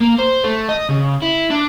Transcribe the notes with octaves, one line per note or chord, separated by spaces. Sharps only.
A#3
C5
A3
D#5
C#3
E4
D4